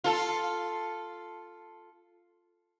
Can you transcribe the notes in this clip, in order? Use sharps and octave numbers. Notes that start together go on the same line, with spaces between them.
F4 A4